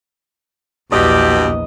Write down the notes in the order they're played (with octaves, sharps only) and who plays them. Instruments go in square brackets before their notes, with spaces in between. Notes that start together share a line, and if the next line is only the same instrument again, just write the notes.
[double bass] A#1 E2 [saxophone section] G2 B2 G4 [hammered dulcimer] D#5